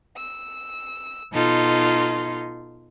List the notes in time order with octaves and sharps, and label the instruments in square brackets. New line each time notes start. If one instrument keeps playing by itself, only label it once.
[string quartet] E6
B2 D#4 F4 A4 C6